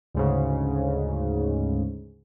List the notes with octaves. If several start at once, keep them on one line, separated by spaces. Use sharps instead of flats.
D2 G#2 C#3